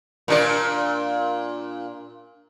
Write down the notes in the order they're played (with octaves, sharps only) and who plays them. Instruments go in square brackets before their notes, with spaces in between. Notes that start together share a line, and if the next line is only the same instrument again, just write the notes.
[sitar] A#2 D4 D5